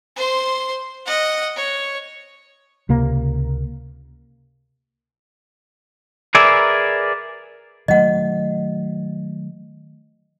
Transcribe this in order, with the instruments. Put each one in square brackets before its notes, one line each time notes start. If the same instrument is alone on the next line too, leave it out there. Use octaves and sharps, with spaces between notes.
[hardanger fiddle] C5 C6
D#5 F#5
C#5
[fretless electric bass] C#2 C3 A#3
[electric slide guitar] G#4 A#4 B4 D5 E5
[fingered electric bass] D#3 F#3 A3 [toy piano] D#5 F#5